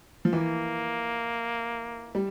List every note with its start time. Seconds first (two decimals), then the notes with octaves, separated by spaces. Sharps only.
0.25 F3
0.33 E3 A#3
2.15 G3